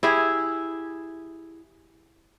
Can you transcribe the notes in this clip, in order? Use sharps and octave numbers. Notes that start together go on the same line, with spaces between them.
E4 G4 G#4